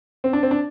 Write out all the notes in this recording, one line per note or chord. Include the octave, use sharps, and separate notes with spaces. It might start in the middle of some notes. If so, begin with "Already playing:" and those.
C4
D4
C4
D4